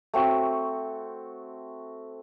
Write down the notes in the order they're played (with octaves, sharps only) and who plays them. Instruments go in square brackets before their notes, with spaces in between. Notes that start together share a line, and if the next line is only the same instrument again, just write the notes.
[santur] A3 C4 F#4